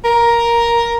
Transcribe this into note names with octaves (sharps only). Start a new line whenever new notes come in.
A#4